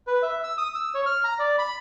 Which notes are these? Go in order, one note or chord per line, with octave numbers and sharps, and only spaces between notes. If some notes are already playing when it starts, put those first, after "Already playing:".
B4
E5
E6
D#6
E6
C#5
F6
A#5
D5
B5